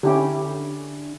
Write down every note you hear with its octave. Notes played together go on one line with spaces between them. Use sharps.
D3 C#4 E4 G4